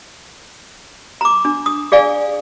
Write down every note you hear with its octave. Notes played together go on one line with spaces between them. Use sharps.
A#5 D6
D4
D#6
G#4 D5 F5 G#5